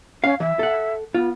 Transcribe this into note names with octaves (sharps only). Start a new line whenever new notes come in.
C#4 F5
E3 E5
A4 F#5
B3 F4